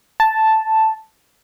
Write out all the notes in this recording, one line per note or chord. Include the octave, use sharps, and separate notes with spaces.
A5